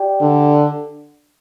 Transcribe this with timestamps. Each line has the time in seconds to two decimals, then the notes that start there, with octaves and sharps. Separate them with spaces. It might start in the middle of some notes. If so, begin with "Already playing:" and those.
Already playing: G4 D5 G5
0.21 D3